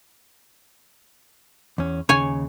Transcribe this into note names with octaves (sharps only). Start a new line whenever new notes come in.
E2 C#4
D#2 C#3 C#5 G#5